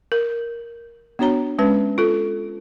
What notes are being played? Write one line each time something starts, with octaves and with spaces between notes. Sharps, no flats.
A#4
B3 D4 F#4 C#5 A#5
G#3 C#4 B4
F4 A4